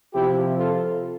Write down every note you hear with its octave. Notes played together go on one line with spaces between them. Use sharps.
C3 F3 E4 G4
F4 A4